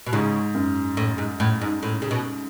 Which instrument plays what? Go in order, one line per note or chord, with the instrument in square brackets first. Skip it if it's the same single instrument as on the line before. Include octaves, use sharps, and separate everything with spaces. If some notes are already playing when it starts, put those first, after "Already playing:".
[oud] B2
[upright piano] G#2 [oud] C#3
[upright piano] F#2
[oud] A2
G#2
A2
G#2
A2
C#3
B2